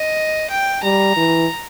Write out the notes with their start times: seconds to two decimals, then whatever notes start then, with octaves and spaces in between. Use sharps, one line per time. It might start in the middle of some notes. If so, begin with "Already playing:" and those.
Already playing: D#5
0.50 G5
0.83 G3 A#5
1.16 E3